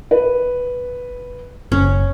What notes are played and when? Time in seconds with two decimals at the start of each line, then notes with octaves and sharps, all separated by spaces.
0.11 B4
1.72 F#1 C#4